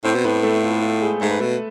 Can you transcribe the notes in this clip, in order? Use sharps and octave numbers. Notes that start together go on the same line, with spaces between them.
A2 C4 C5
B2
A2 B3 B4
A3 A4
F4
F4
G#3 G#4
G#2 A3 A4
B4
B2 A3 A4